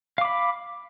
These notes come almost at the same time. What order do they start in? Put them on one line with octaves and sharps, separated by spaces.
F5 D6 B5